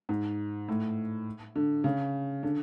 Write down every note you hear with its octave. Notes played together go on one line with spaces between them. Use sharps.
G#2
A2
D3
C#3
D3